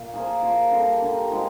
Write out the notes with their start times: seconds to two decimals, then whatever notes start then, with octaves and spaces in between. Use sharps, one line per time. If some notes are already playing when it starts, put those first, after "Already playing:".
Already playing: A#2
0.14 F3 A#3 F4 G#4
0.42 F3 A#3 F4 G#4
0.72 D3 G3 A#3 D4
1.02 D3 G3 A#3 D4
1.31 D3 F3 G#3